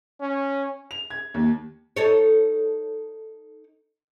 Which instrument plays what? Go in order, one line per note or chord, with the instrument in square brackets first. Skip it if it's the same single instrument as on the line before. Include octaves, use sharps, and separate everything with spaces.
[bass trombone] C#4
[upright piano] F7
G#6
D#2
[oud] D#4 A4 C#5